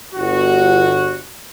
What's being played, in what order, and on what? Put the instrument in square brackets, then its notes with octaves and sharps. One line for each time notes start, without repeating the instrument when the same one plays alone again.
[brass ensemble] G1 F#4